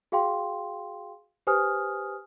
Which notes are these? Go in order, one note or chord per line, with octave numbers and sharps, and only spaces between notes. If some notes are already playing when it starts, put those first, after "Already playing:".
F#4 G#4 F5 G5 C6
G4 B4 C5 G#5 D#6 F6